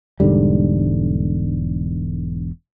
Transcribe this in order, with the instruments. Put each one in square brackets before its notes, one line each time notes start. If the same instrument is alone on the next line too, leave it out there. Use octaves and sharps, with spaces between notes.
[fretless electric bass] E1 G#2 D3 G3